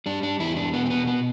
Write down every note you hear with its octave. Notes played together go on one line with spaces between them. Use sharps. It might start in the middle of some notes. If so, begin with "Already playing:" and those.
G3 D4
D4
E2 E4
D4
B2 B3
C4
B3
B3